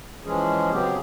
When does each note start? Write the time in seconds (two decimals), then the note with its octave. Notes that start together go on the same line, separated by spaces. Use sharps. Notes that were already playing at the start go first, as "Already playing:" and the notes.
0.25 E3 F3 G#3 C#4 G#4
0.72 C#3 F#3 B3 C4 G4 G#4